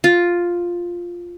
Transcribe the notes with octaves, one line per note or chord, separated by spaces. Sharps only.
F4